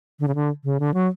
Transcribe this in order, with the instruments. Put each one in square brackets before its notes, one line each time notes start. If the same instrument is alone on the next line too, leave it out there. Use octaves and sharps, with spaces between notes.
[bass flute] D3
C#3
D3
C#3
D3
F#3